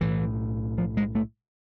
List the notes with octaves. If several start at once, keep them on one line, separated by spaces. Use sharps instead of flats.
B1 A2 E3
F3
G#3
A3